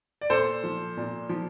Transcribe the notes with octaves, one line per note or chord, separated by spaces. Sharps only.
D5
A#2 A4 C5
F3
A#2
F3